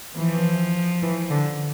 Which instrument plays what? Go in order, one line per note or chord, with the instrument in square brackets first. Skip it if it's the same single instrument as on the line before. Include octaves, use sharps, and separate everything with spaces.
[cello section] E3 [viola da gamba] F3
[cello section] E3
D3